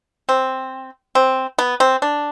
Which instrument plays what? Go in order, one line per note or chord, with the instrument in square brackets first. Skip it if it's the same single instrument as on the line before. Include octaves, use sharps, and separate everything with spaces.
[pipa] C4
C4
B3
C4
D4